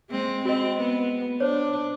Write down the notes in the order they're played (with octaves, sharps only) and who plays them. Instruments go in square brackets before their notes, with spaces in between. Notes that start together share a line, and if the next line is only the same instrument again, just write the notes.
[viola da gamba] G#3 C4
[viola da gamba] C4 [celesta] F#4 D#5
[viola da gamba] B3
[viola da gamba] D4 [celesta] C5 C#5